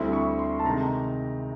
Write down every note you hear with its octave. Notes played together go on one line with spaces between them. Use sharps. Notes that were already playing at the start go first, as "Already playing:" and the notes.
Already playing: D2 D3 G3 C4 E4
C#6
C6
A5
C3 D#3 G#3 A#5